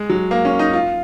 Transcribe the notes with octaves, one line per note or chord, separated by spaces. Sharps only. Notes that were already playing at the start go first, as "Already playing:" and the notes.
Already playing: G#3
F#3
A#3
C#4
D#4
F4